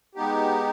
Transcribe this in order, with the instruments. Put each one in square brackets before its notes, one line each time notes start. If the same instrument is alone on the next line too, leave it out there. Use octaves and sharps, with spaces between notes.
[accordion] G#3 B3 D#4 G4